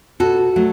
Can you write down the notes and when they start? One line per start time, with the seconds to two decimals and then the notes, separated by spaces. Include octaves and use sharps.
0.20 B2 F#4 A4
0.56 F#3 A3